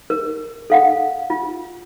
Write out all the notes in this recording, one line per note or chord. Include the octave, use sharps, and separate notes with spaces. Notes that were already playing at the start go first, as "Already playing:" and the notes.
A#4
A4 F5 F#5
F4